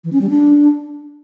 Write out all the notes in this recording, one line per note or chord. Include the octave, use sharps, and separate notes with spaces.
E3
C#4
G3
D4